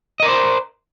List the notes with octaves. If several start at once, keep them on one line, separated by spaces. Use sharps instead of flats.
A#4 C5 D5 D#5